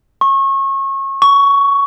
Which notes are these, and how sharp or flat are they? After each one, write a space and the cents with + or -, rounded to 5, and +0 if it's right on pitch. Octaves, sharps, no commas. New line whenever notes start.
C#6 -30
C#6 +15